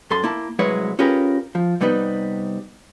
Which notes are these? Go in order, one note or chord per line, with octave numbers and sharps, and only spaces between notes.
F#2 A4 C6
A#3 E4 A5
C2 F#3 G#3 E4 B4 C#5
C#4 F4 G4 G#4 A#4 B4
F3
C3 G3 B3 D#4 B4